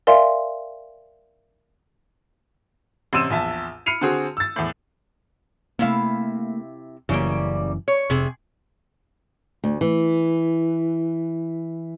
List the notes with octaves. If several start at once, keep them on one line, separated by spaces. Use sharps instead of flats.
A#4 D5 E5 F5 G#5 C6
A1 C3 C6 E6 D#7 E7
A#1 E2 E5 A5
B5 F6 C7 C#7 D#7 F7
D3 C4 F#4 G#4
E6 A6
E2 A2
C3 A3 A#3 E4 F5
F#1 F#2 C#3 E3 G3 A#3
C#5
F1 C3 G#4
D2
E3